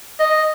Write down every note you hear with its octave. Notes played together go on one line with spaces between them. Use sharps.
D#5